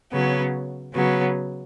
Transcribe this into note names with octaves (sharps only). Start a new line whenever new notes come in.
C#3 F#3 B3
C#3 F#3 B3